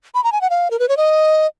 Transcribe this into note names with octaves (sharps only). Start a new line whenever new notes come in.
B5
A#5
G#5
F#5
F5
A#4
B4
C#5
D#5